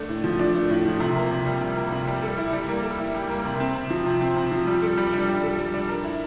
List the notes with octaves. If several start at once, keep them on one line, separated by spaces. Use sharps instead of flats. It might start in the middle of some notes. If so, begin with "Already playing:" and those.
Already playing: A3 D4
A2
F3
D4
A3
A2
F3
C3
A#3
C3
G3
C3
A#3
C3
G3
A4
E4
G3
A#3
A4
E4
G3
A#3
C3
C4
C3
F3
C3
C4
C3
F3
G3
A4
G3
D4
G3
A4
G3
D4
A#4
E4